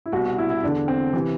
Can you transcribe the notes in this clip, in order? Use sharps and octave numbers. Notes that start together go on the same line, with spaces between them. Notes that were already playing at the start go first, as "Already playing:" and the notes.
E4
C2 B2 F#4
F#4
E4
E4
E2 D3 D4
C4
C3 E3